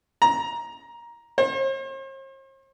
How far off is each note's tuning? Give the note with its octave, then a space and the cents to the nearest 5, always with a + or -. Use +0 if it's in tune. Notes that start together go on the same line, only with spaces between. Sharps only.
A#5 +15
C5 +45